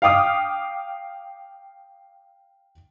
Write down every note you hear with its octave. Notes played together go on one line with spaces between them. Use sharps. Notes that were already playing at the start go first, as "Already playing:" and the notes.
F5 G5 D6 D#6 F6